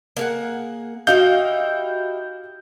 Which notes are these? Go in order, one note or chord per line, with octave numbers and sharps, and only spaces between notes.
A#3 G#4 F#5
D#4 E4 F#4 G4 F5 G6